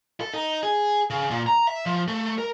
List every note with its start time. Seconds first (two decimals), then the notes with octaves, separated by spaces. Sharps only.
0.21 A4
0.34 D#4
0.63 G#4
1.10 C#3
1.30 A#2
1.46 A#5
1.67 E5
1.86 F3
2.08 A3
2.38 A#4